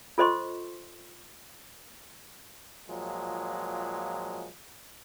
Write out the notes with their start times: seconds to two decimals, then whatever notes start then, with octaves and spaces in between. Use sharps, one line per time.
0.18 F4 A4 C5 D#5 C6 C#6
2.89 A#2 F3 F#3 G#3